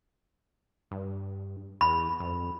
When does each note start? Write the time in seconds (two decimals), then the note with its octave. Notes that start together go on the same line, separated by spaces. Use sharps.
0.91 G2
1.81 E2 B5
2.20 F2